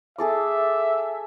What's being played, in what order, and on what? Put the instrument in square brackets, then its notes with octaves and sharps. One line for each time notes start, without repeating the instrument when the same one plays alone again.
[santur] G#4 A4 D6 [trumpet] E5